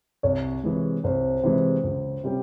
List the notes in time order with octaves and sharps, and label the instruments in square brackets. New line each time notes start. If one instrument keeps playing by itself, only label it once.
[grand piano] C2 [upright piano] C#5
[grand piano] C3 E3 G#3
[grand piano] C2 [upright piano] C5
[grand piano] C3 E3 G#3
C#2
C3 G3 C#4 G4